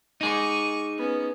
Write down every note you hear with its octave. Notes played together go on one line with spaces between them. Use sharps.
D#4 G#4 C#6 D6
B3 C#4